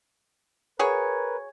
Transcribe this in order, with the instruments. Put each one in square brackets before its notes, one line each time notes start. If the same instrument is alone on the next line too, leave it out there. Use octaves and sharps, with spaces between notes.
[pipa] F#4 G#4 C#5 [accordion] A#4 B4